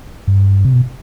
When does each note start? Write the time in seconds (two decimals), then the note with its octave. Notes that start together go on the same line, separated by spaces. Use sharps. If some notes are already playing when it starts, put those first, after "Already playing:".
0.28 G2
0.65 C3
0.73 B2